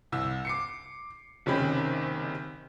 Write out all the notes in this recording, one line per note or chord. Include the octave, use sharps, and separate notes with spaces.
C2 E6
D6 C7 C#7
F#1 C3 D#3 C#4 G4 B5